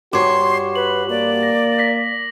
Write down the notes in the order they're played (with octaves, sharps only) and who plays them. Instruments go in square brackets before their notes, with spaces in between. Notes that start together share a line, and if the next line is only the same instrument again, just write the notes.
[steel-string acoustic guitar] G2 C#5 [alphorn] F#4 [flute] C6 [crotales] D6
[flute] B4 [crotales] F#7
[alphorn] A#3 [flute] D5
[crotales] A#6
A#6 B6